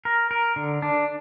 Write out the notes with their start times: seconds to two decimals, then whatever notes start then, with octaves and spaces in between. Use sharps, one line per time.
0.05 A#4
0.31 A#4
0.56 D3
0.82 D4